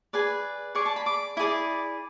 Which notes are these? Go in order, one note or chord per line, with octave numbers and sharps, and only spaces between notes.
G#4 B4 D5
G#4 D5 C#6
A5
B5
D6
E4 G#4 D5